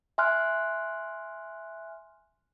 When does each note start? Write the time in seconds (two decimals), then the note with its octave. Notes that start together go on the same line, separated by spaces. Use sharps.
0.18 E5 G#5 C6 F6 F#6